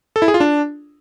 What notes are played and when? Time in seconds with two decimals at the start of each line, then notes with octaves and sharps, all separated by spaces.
0.16 A4
0.22 E4
0.28 G#4
0.34 F4
0.40 D4